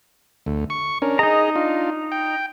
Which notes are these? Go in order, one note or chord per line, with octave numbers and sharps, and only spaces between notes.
D2
C#6
C#4 D4 A#4
D#4 G#4 D#5 A#5
D4 F4
G5